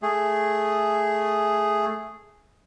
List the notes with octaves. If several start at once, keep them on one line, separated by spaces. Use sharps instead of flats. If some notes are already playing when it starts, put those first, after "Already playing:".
A3 G#4